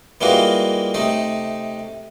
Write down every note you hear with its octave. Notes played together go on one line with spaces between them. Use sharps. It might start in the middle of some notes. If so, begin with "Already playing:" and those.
E3 G3 G#3 A#3 F4 F#4
C3 A3 D#4